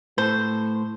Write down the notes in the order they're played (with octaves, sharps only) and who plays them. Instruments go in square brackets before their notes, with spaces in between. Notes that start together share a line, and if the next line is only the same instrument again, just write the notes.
[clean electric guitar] A2 A4 [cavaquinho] C5